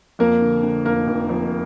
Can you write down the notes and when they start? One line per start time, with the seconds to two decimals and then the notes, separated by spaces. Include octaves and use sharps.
0.19 F2 A#3 A#4
0.41 D3
0.63 D3
0.85 F1 A#3 A#4
1.07 F1
1.29 F2